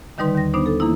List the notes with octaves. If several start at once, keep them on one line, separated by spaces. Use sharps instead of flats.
D3 D#3 G3 D#4 B4 C6
D#2 A#6
B3 D4 D#4 C5
A4
E3 A#3 D#4 E4